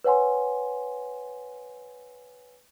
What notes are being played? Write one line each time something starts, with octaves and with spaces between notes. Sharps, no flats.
B4 C#5 F#5 G#5 C6